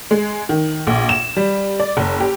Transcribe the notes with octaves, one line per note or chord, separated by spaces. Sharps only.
G#3
D#3
A#1
E7
G3
D5
F#1
G4